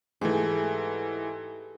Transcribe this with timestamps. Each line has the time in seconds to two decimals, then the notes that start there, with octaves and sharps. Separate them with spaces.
0.21 G#2 E3 A3 G4 G#4